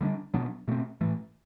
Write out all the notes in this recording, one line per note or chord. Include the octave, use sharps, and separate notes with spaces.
D3 G3 B3 D4
B2 F#3 B3 D4
B2 A3 C4
A2 E3 A3